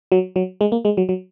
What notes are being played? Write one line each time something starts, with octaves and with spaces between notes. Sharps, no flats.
F#3
F#3
G#3
A#3
G#3
F#3
F#3